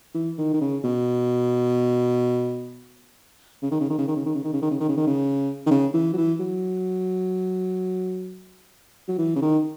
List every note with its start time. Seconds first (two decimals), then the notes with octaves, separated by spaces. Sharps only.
0.14 E3
0.38 D#3
0.53 D#3
0.61 C#3
0.84 B2
3.63 C#3
3.71 D#3
3.81 C#3
3.90 D#3
3.98 C#3
4.08 D#3
4.16 C#3
4.26 D#3
4.35 C#3
4.44 D#3
4.53 C#3
4.62 D#3
4.71 C#3
4.80 D#3
4.89 C#3
4.97 D#3
5.07 C#3
5.66 D#3
5.71 C#3
5.94 E3
6.13 F#3
6.17 E3
6.40 F#3
9.08 F#3
9.18 E3
9.36 C#3
9.42 D#3